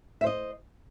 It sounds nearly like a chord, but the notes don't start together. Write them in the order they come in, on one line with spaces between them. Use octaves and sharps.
E5 C5 D#5